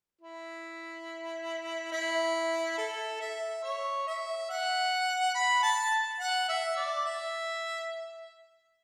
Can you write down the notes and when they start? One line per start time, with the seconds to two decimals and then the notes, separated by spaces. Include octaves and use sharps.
0.21 E4
1.92 E4
2.78 A4
3.21 E5
3.64 C#5
4.07 E5
4.50 F#5
5.35 B5
5.63 A5
6.20 F#5
6.49 E5
6.77 D5
7.05 E5